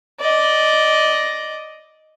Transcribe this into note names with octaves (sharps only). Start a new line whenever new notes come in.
D5 D#5